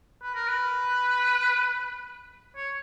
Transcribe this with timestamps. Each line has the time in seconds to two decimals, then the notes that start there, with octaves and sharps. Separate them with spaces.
0.22 B4
0.34 A#4
0.48 B4
2.56 C#5